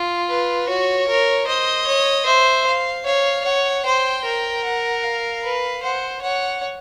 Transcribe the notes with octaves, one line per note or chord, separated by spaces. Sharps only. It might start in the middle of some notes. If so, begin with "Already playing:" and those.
Already playing: F4
B4
F#4 C#5
A#4
C5 D#5
C#5
C5 E5
F5
C#5 F5
C#5 F#5
C5 G5
A#4
F#5
F5
B4
C5 F#5
C#5 F#5